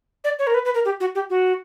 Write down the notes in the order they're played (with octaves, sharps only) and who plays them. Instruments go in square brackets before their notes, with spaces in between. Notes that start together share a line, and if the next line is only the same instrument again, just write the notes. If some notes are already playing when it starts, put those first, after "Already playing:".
[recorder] D5
C#5
A#4
B4
B4
A#4
G4
F#4
G4
F#4